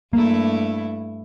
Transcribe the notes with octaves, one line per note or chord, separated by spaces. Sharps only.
G2 A3 A#3 E4